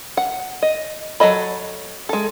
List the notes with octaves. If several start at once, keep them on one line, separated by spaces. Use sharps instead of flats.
F#5
D#5
F#3 A4 D#5 B5
G#3 A4